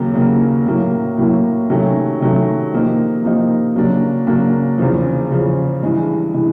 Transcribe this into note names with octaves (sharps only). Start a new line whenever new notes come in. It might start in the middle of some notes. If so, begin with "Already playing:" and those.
Already playing: D#2 C#3 F#3 A#3
D#2 C#3 F#3 A#3
A2 F#3 A#3
A2 F#3 A#3
C3 D#3 F#3 A3 C#4
C3 D#3 F#3 A3 C#4
C3 F3 A#3 D#4
C3 F3 A#3 D#4
C#3 F#3 A#3 D4
C#3 F#3 A#3 D4
E2 C#3 F3
E2 C#3 F3
G2 E3 G#3
E3 G#3